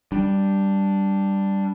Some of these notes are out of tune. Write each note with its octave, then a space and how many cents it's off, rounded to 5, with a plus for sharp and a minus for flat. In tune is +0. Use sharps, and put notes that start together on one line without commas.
G3 +0 D4 +0